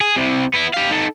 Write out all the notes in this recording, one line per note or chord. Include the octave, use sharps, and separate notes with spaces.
G#4
C2 C3
B3 E4
G4 F5
D#4 A4